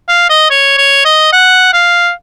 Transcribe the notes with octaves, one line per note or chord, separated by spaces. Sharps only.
F5
D#5
C#5
C#5
D#5
F#5
F5